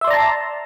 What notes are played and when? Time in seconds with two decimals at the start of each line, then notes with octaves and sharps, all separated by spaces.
0.01 E5
0.04 C6
0.07 D5
0.10 A#5
0.13 A5